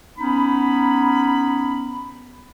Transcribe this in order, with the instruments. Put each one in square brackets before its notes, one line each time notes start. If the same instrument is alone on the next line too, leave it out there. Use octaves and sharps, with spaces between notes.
[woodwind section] B3 C#4 D#4 B5